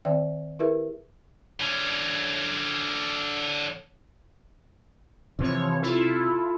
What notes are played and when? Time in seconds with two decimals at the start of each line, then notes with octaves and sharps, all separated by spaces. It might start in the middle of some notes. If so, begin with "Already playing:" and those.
0.05 D#3 C4 D5 E5 G5
0.59 E4 G4 G#4 A#4 B4 E5
1.60 D3 C#4
5.39 C3 E3 F3 C#5
5.82 E4 F4 A4